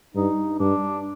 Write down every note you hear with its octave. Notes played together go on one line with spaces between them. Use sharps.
G2 D#4
G2 D4